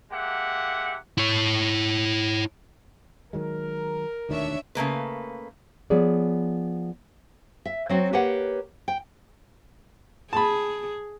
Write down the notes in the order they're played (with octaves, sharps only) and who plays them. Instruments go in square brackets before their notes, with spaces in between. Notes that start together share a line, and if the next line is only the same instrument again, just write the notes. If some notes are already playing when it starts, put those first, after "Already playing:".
[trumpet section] G#3 A#3 G4 E5 F#5
[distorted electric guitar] E4 C#5
[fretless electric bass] D#3 F#3 G#3 [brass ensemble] A#4
[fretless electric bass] E1 D2 D#3 [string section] D4 C#5 E5
[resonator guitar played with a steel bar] C#3 A3 A#3 B4
[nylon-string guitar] F3 B3 G#4 C#5 D5
E5
F#3 C4 F#4
A#3 G4 B4 C#5 F#5
G5
[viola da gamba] G#4 [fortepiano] A5 B5